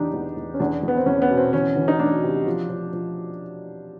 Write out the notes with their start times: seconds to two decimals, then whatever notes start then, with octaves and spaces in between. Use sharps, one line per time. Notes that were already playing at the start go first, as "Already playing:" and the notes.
Already playing: E2 E3 D4 D#4 G4
0.13 E2
0.37 E2
0.54 C#4
0.60 E2 D4
0.83 E2
0.88 B3
0.97 C4
1.06 E2 C#4
1.22 B3
1.30 B2
1.38 C4
1.53 E3 C#4
1.76 E3
1.88 D#4
1.99 D2 D4
2.23 C3
2.46 F3
2.70 F3
2.93 F3